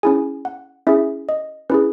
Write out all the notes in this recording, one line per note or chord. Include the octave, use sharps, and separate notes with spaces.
C#4 E4 G#4 G#5
F#5
C#4 E4 G#4 E5
D#5
C#4 E4 G#4 B4